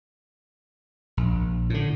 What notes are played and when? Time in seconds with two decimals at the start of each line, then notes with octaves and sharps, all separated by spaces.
1.17 A#1
1.70 A2 D3